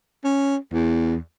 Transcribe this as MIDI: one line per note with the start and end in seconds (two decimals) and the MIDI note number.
0.24 0.56 61
0.73 1.16 40